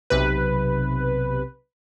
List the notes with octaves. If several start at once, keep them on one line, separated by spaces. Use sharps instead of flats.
B1 C3 B4